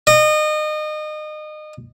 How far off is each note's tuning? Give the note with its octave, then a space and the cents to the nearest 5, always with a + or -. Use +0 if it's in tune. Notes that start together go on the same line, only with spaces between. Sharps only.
D#5 -30